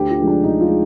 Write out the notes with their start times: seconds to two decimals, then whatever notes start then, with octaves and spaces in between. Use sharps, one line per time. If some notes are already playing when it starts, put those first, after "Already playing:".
Already playing: D2 G4
0.10 F4
0.19 D3 F3 G#3
0.27 D4
0.44 D2 D#4
0.61 F4
0.69 G#3